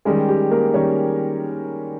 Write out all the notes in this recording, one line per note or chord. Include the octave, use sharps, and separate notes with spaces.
D#3 G3 G#3 C#4 G#4
G4
A#3 A#4
D#3 G3 C#4 C#5